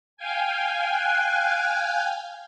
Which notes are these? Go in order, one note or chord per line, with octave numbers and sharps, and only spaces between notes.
F5 G5 G#5
F#6